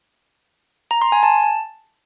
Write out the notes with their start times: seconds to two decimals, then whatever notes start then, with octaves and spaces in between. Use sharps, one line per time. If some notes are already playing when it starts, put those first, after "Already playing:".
0.91 A#5
1.02 C6
1.12 G#5
1.23 A5